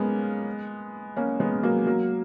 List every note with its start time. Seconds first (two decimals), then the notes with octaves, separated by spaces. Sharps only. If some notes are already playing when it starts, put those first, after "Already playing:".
Already playing: G#3 A#3 B3 C#4
1.16 A#3 C#4
1.40 G#3 B3
1.63 F#3 A#3
1.87 F#3 A#3